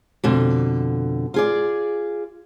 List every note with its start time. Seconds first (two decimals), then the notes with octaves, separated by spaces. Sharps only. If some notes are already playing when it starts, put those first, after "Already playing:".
0.24 F2 B2 D3
1.34 F4 G#4 D5